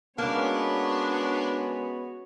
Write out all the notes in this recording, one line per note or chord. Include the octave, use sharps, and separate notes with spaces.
G#3 A#3 B3 C#4 D4 F#4 C#5